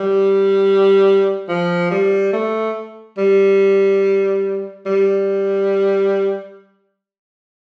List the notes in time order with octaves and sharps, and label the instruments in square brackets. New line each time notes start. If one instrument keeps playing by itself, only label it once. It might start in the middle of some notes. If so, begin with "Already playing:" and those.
Already playing: [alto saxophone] G3
F3
G3
A3
G3
G3